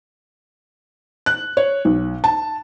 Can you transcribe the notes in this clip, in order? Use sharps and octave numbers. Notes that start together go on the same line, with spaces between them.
F#6
C#5
B1
A5